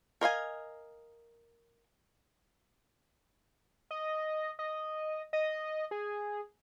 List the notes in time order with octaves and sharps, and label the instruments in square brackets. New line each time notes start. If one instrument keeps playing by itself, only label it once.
[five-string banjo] A#4 D#5 F5 G#5
[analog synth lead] D#5
D#5
D#5
G#4